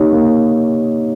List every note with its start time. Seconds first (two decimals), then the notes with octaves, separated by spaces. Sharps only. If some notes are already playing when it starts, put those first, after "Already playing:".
Already playing: A#3 D#4 G4 C#5
0.12 A#3